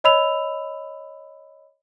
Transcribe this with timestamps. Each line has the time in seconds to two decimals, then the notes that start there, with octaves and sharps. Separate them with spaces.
0.04 C#5 D#5 B5 E6 F7